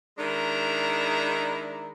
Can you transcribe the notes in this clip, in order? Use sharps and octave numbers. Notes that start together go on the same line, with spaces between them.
D#3 G#3 D4 E4 A#5